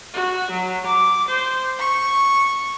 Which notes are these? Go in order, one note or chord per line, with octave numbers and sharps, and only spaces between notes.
F#4
F#3
D6
C5
C#6